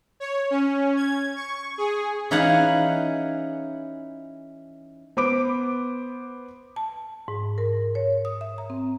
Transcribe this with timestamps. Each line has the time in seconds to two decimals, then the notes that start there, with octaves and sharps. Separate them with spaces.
0.20 C#5
0.51 C#4
0.97 G#6
1.36 C#6
1.78 G#4
2.31 E3 C#4 D#4 G#4 F5 F#5
5.17 B3 C5 B5 D6 D7
6.76 A5
7.28 G#2
7.58 A#4
7.95 C#5
8.25 D#6
8.41 E5
8.58 A#5
8.70 C4